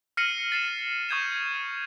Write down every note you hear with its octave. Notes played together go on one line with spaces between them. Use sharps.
F6 A#6 C7 C#7 D#7 F#7
A6 C7 E7
C#6 D#6 G6 G#6 D#7 E7